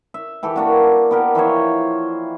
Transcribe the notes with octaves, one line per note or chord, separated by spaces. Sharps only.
E5
E3 G4 A4
A#3 D4 F#4
B3 G4 A#4
E3 F3 C5 C#5